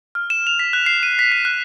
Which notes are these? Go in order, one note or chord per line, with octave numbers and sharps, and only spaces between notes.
F6
E7
F7
B6
F#6
C7
D#7
B6
C7
F#6